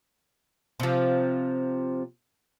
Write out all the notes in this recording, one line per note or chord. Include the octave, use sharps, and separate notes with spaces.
C3 F3